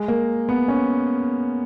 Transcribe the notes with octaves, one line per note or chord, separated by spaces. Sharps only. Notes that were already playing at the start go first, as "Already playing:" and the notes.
Already playing: G#3
A#3
B3
C#4